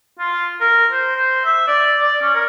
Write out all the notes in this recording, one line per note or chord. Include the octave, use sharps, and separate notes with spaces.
F4
A#4
C5
C5
E5
D5
D5
C#4
A#4